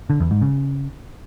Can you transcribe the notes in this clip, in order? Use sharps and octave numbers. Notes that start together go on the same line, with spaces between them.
D3
E2
G#2
C#3